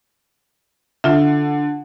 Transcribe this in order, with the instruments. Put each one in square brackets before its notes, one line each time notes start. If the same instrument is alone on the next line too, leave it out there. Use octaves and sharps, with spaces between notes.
[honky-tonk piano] D3 [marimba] F4 E5